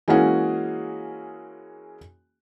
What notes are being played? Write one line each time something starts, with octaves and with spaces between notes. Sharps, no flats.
E3 G#3 A#3 C#4 F#4 G#4